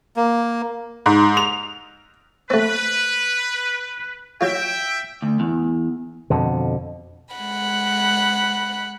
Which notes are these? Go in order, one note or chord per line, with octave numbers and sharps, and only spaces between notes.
A#3
G#2
F7
A3 C4 B4
F#3 F4 E5 G5
D2
E2
F2 B2 D3
G#3 F#5 B5